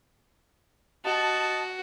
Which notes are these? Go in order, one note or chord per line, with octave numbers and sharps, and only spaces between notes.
F#4 D#5 A5